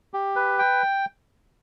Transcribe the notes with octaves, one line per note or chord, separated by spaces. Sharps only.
G4
B4
G5